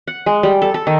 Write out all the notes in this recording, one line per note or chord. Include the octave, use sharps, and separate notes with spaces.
F#5
G#3
G3
A4
A4
D#3